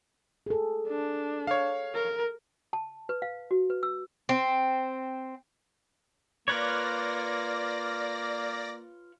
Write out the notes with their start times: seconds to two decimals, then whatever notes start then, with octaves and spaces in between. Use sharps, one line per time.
0.46 G#4 A4
0.88 D4
1.47 C#5 F5
1.94 A#4
2.73 A5
3.09 B4
3.22 F5
3.51 F#4
3.70 B4
3.83 E6
4.29 C4
6.48 A#3 F4 B4 C#5 D5 A#6